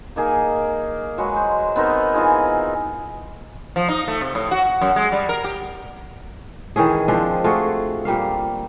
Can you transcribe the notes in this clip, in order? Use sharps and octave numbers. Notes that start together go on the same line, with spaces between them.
A#3 D#4 G#4 A#4
F#3 G#3 B4 C#6
C5
B3 C4 D#4 A#4
E3 D#4 F4 G#4
F3
D#4
A3
C3
A2
F#4
F#2
G#3
G3
A#4
G4
D#3 E3 C#4 G#4
F3 G#3 C4 D4
A3 F4 F#4 G#4
A#2 G3 A#3 F5